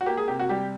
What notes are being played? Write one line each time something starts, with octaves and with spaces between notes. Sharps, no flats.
F#4
A#3 G4
G#4
C3 G4
F#4
G3 G4